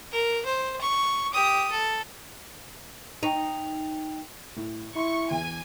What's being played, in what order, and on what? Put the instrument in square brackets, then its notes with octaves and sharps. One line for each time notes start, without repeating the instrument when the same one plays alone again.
[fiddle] A#4
C5
C#6
G4 D#6
A4
[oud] D#4 [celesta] G5 C#6 F7
[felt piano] A2
[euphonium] E4 [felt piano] C6 [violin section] C#6
[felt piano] E2 [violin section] G#5